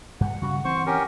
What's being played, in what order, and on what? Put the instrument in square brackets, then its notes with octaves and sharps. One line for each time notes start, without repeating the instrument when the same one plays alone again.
[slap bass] G2 [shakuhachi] F#5
[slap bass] C#3 G3 [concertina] F#4
[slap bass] E3 C4 [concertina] C5 C#6
[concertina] C#4 G4 A#4